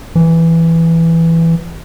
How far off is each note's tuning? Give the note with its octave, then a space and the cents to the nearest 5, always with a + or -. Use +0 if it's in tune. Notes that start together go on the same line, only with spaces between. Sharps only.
E3 +5